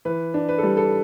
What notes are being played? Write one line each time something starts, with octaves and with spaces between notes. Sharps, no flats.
E3 B4
D4
B4
A4
G3
A4